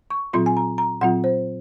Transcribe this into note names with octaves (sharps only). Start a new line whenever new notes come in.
C#6
A#2 F#3 C4 F4 C6
G#5
A#5
A#5
A#2 F#3 C4 F4 F#5
C5